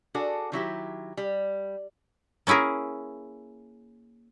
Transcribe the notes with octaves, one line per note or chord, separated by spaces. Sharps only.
D4 F#4 G#4 A4 D5
D#3 F#3 E4 G4
G3
A#3 C#4 E4 G#4 A#4